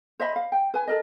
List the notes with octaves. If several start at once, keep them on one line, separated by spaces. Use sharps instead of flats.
C5 D#5 E5 B5
F5
G5
B4 G#5
A4 A#4 D#5